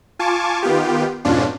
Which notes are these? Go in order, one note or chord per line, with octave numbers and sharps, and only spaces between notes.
F4 G#5 A5 C#6 D6
D#3 B3 F4 G4
F2 G#2 B2 C#4 D4 F4